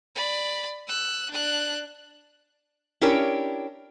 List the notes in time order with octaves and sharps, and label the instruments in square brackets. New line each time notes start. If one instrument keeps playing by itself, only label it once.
[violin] D5 B5
E6 F#6
D4 F#6
[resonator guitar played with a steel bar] C#4 D4 E4 G4 A#4 C#5